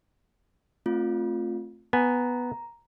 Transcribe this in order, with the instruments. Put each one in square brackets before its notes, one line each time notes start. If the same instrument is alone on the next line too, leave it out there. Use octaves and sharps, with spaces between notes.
[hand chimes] A3 C4 F4
[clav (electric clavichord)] B3 G#5 [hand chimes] A#5